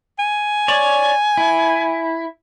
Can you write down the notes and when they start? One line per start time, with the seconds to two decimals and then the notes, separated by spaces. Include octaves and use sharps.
0.19 G#5
0.68 C#5 D5
1.37 E4